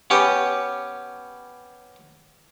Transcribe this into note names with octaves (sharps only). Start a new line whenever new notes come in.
B3 C#4 G4 B4